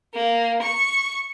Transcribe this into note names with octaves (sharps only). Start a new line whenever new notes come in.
A#3
C#6